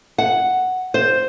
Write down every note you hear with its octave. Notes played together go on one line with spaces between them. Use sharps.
F#5
C5